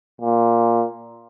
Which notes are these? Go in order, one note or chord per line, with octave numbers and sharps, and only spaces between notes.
A#2